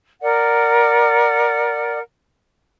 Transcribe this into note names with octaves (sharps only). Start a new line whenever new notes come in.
A#4 D5 F#5